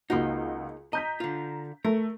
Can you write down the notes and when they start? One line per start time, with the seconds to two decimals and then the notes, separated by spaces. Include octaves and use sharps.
0.10 C#2 A#3 D#4 F#4
0.93 D#5 A#5 G6 B6
1.20 D3 F4
1.85 A3 A#4